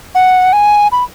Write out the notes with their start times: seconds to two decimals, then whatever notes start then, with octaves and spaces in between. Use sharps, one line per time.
0.15 F#5
0.53 G#5
0.92 B5